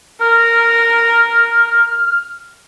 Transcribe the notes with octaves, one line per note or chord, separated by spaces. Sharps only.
A#4 F6